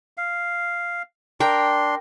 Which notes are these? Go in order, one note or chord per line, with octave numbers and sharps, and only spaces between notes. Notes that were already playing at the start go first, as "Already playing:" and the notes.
F5
D4 A#4 G5 C6